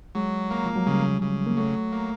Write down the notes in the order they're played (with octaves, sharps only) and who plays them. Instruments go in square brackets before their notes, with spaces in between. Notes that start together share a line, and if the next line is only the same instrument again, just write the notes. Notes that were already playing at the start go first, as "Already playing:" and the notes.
[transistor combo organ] F#3 [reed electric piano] G#3
[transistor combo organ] A#3
[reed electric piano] F3
F#3
[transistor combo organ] C#3 [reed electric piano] G3
[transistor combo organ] C#3
[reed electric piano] A#3
[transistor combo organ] F#3 [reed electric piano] A3
[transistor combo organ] A#3